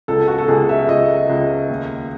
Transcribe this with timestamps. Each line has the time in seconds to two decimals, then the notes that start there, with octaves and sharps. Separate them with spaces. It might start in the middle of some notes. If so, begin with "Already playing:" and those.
0.08 C#2 A4
0.28 F#4
0.38 A4
0.48 C#2 G#4
0.69 E5
0.88 C#2 D#5
1.29 C#2
1.69 D#2